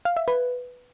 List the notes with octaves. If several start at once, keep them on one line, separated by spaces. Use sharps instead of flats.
F5
E5
B4